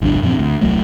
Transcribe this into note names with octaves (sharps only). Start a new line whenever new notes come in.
G#1 C#2 F#2 D4
F#2 A#2 F3 C4
D2
D#1 C2 F#3 A3